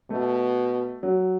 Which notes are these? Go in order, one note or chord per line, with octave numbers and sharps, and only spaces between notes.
B2 A3
F#3